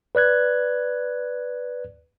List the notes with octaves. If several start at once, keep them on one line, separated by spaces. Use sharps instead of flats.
B4 D5 F#6 G#6